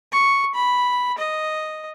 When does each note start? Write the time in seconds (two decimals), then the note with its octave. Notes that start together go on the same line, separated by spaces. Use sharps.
0.12 C#6
0.54 B5
1.18 D#5